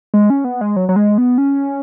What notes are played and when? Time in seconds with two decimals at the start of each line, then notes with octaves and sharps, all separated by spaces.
0.14 G#3
0.30 C#4
0.44 B3
0.61 G#3
0.76 F#3
0.89 F#3
0.96 G#3
1.18 B3
1.38 C#4